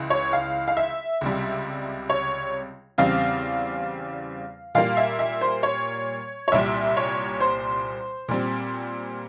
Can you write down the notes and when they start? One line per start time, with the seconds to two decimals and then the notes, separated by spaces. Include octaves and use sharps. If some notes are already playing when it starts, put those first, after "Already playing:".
Already playing: C#2 E3
0.10 C#5
0.33 F5
0.68 F5
0.77 E5
1.21 C#2 C3 G3
2.10 C#5
2.98 E2 C#3 G3 C4 F5
4.75 A#2 G3 A#3 F5
4.97 E5
5.19 E5
5.41 C5
5.63 C#5
6.48 C#5
6.52 C2 A#2 G3 E5
6.97 C#5
7.40 C5
8.28 A#2 G3 C4